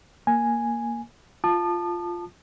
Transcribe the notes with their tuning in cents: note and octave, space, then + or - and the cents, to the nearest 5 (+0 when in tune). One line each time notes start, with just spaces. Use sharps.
A#3 +0 G#5 +0
F4 +0 A5 +0 D#6 -45